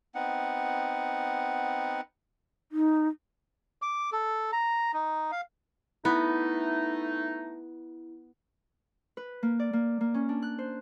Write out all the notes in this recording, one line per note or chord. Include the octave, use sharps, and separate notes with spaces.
B3 C4 D#4 F#5
D#4
D6
A4
A#5
D#4
F5
A3 B3 D#4 E4
B4
A#3
D5
A#3
A#3
C#4
D4
F#6
C5